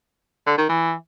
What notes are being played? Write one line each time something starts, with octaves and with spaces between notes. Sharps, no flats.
D3
D#3
E3